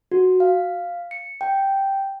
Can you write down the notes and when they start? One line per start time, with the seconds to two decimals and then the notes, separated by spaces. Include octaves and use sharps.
0.12 F#4
0.40 F5
1.11 C#7
1.41 G5